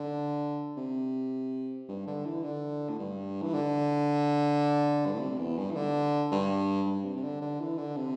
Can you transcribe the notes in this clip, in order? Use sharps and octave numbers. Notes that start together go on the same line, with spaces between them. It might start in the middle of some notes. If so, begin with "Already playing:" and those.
Already playing: D3
C3
G2
D3
E3
D3
A2
G2
E3
D3
G2
A2
C3
E2
G2
E3
D3
G2
G2
C3
C3
D3
D3
E3
D3
C3